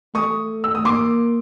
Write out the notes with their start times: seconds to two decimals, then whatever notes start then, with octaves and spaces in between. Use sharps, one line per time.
0.15 A3 C#6 D#6
0.64 E6
0.75 D#6
0.85 A#3 C6 D6